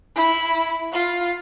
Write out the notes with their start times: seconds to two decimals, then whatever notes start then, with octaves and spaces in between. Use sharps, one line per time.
0.16 E4
0.93 F4